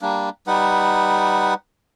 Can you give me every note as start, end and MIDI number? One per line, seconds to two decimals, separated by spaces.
0.01 0.30 55
0.01 0.30 58
0.01 0.30 62
0.47 1.54 55
0.47 1.54 63
0.47 1.54 71
0.47 1.54 78